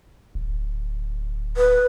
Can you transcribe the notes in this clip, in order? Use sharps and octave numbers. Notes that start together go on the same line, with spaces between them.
D1
B4